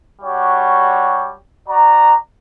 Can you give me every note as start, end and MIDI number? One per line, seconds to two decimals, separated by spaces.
0.21 1.32 55
0.21 1.32 62
0.21 1.32 66
0.21 1.32 67
0.21 1.32 73
1.67 2.13 66
1.67 2.13 74
1.67 2.13 82